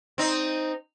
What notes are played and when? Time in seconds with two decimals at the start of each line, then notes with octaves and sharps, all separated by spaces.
0.18 C4 D#4